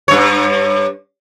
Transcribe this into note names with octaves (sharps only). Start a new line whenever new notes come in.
G2 C#5